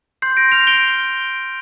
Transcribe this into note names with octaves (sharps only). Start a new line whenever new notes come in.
C6 G6 C7
A#6 D7
F6 C7 F7
D7 G7